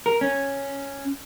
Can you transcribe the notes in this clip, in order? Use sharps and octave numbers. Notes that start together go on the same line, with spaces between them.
A#4
C#4